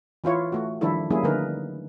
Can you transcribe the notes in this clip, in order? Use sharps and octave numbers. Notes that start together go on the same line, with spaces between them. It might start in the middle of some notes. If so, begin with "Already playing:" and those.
E3 E4 F4 C#5
A3 F#4
D#3 F3 G3 D4 E4 A4
F#3 G3 A#3 C#4 E4 G#4
D3 F3 A3 D#4 A#4 B4